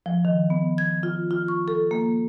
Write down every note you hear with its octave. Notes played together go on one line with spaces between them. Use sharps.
F3
D#3
B3
G#6
F4
F4
C#6
A4
A#3